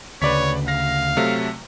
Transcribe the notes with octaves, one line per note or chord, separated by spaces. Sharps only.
D2 C#3 B4 C#5 D5 B6
F5 A#6
C3 F#3 A3